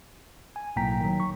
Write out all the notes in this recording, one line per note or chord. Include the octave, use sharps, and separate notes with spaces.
G#5
B1 A2 A#3 G5 A#5 B6
D#3 F#3
C#6